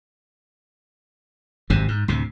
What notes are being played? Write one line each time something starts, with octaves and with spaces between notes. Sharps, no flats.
G#1 F#2 C3
G#2
D2 A2 C3